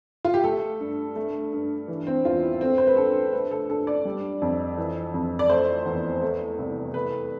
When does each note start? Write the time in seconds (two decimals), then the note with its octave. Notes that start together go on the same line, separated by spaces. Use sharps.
0.25 F4
0.34 G4
0.44 A3 A4
0.80 G2
1.16 A3
1.52 G2
1.88 E3
2.07 C4
2.25 E2 F4
2.43 E4
2.61 A3 C4
2.78 C5
2.87 B4
2.97 G2 A4
3.33 A3 B4
3.51 A4
3.69 G2 A4
3.87 D5
4.05 G3
4.42 F2
4.78 E3
5.14 F2
5.39 D5
5.50 A3 C5
5.86 E2
6.21 A3
6.58 C2
6.94 A3 B4